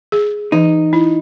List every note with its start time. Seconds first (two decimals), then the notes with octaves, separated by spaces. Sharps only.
0.12 G#4
0.52 E3 D#4
0.93 E4